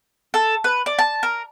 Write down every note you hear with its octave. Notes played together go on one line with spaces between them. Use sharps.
A4
B4
D5
A5
A#4